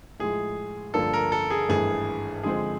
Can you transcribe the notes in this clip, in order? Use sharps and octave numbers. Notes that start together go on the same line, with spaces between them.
A2 F3 G#3 G#4
G2 D3 F3 A#3 D4 A4
A#4
A4
G#4
G#1 G2 E3 A3 G#4
D3 F3 G#3 C4 G#4